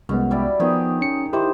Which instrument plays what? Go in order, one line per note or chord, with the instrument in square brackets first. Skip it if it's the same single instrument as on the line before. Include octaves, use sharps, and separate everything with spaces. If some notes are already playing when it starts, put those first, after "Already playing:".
[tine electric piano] C2 G#3 B3 [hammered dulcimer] F#2
[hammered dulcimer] G3 E4 D5
[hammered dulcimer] D#3 G4 G#4 [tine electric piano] F3 B3
[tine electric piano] C#4 C#7
[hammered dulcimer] D#3 C5 [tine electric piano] D#4 E4 G4